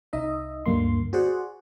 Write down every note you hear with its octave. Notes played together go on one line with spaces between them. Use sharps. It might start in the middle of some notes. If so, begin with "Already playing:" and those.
C2 D#4 D#5 E5
D2 G2 D3 A#3 C6
F#4 G#4 C5 D5 F#5